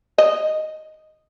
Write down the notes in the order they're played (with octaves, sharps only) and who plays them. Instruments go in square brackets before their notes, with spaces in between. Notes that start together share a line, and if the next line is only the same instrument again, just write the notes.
[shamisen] D#5